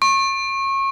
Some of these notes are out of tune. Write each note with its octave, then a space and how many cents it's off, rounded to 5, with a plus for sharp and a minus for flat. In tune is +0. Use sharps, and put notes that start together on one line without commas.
C#6 -30